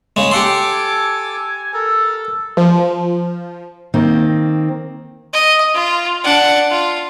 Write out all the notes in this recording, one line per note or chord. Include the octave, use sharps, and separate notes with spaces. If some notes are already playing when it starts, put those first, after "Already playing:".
C#3 G#3
G4 A4 F#5 C6 D6
G#5
A4 A#4
F3
D#3 A#3 C4
D#5
F4
D4 F#5
F4